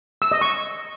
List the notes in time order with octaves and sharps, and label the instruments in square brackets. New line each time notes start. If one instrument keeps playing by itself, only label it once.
[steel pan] E6
D#5
C#6